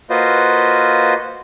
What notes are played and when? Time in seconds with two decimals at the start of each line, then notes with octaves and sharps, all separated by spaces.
0.10 A#3 F4 F#4 B4 C5 D#5